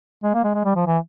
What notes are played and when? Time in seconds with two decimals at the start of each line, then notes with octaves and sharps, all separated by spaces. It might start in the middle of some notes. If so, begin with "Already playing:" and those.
0.23 G#3
0.34 A#3
0.44 G#3
0.55 G#3
0.65 G3
0.76 F3
0.87 E3